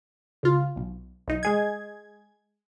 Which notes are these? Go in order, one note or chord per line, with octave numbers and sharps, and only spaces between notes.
C#2 F4
B1
B1 D#4
G#3 G#4 G#6